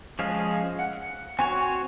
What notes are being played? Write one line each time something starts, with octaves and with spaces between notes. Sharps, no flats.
F3 G#3 C#4 G#4 F5
F#5
C4 F#4 C#5 G#5